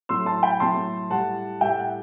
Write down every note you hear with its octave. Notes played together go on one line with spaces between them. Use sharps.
A2 F#3 A3 C6 E6
A5 C6
G5 B5
A2 F#3 A3 A5 C6
A2 G3 F#5 A5
A2 G3 E5 G5
F#5